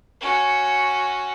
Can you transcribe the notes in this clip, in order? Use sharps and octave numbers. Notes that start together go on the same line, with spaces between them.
C#4 F#4